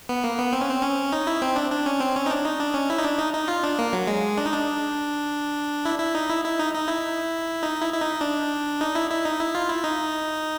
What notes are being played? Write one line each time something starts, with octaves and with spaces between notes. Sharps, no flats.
B3
A#3
B3
C4
C#4
C4
C#4
D#4
E4
C4
D4
D4
C#4
C4
C#4
D#4
D4
D#4
D4
C#4
E4
D#4
D4
D#4
D#4
F4
D4
A#3
F#3
G#3
D4
D#4
D4
E4
E4
D#4
E4
E4
D#4
D#4
E4
D#4
E4
E4
D#4
D4
D#4
E4
E4
D#4
E4
F4
E4
D#4